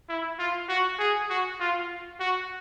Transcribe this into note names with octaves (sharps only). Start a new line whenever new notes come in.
E4
F4
F#4
G#4
F#4
F4
F#4